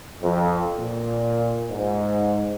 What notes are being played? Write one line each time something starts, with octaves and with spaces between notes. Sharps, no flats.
F2
A#2
G#2